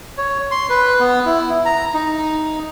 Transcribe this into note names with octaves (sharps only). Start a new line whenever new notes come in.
C#5
C6
B4
B3
E4
A#5
D#4